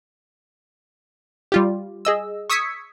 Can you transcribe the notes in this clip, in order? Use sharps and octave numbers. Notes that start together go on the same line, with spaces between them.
G3 F4 G4
G#4 D#5 E6
C#6 D#6 E6 G#6 B6 C#7